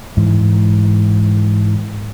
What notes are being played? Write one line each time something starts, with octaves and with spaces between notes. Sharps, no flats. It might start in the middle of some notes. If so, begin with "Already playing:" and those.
G#2 E3